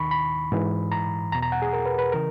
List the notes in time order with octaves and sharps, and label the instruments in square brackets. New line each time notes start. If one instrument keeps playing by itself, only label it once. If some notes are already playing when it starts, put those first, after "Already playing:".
Already playing: [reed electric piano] D#2 D#3 B5 C#6
B5
G#2 E3
A#5
E2 B2 A#5
A#5
F#5
G#4
A#4
B4
B4
C#3 E3 A#4